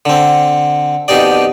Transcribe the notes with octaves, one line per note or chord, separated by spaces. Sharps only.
D3 C4
F2 B2 D#4 G4 D5